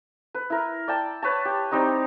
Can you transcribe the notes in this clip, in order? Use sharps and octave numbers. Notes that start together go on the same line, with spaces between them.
B4
E4 A#4
D5 G5 A5
B4 C#5 A5
G4
G3 C4 D#4 A#5